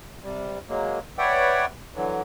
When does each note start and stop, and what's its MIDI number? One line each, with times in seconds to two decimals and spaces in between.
0.24 0.59 48
0.24 0.59 55
0.69 0.99 54
0.69 0.99 56
0.69 0.99 58
1.18 1.66 71
1.18 1.66 73
1.18 1.66 74
1.18 1.66 76
1.18 1.66 78
1.18 1.66 79
1.95 2.22 50
1.95 2.22 52
1.95 2.22 54